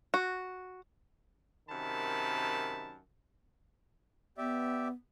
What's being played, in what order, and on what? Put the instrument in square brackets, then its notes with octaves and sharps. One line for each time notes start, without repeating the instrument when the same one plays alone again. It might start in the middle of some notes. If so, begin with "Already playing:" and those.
[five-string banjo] F#4
[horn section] F#2 C3 D#3 A5 B5
[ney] B3 [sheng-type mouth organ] G4 D5 E5